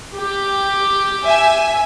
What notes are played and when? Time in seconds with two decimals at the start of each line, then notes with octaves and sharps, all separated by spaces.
0.14 G4
1.25 E5 G#5